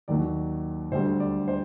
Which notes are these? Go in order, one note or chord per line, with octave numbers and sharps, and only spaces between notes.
D#2 D#3 F#3 D5
D2 D3 G3 C5
D5
C5